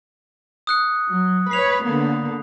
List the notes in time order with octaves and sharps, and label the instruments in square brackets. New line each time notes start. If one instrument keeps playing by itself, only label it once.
[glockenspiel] D#6 F#6 C#7
[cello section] F#3
[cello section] B4 C#5 [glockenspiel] C7 F7
[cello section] D3 A#3 B3